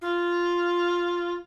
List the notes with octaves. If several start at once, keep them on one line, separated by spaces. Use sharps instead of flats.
F4